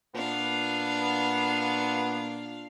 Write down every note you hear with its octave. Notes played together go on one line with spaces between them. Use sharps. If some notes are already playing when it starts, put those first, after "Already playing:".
A#2 B3 D4 F5